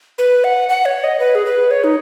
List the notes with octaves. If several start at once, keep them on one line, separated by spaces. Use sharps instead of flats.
B4
F#5
F#5
C#5
D#5
B4
G#4
B4
C#5
D#4